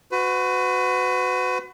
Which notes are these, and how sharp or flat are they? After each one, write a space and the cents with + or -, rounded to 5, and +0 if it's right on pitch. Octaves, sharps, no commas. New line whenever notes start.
F#4 -10 B4 +35